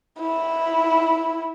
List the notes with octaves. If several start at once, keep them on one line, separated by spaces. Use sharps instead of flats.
E4